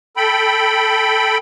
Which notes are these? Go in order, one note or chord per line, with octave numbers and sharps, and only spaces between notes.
A4 G5 B5